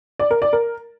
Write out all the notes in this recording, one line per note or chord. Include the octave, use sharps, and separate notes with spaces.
D5
A#4
D5
A#4